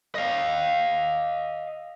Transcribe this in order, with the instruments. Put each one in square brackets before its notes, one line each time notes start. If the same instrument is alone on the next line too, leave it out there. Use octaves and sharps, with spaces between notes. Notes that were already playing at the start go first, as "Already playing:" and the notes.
[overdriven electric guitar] D#5 F5